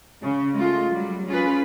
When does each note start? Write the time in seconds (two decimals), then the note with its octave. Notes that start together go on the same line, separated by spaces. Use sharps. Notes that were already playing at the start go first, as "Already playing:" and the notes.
0.22 C#3
0.54 G#3 A3 F4
0.91 F#3 G3
1.28 C#4 F4 G#4 B4